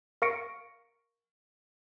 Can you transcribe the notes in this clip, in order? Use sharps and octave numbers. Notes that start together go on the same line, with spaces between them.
A#4 F5 C#6 A#6 C#7 D7